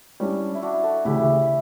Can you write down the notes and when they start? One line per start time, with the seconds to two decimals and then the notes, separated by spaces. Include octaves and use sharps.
0.20 G3 C#4 D4 E4
0.54 E4
0.62 D4 F#4
0.83 F#4 A4
1.05 D2 C#3 E3 E4 G4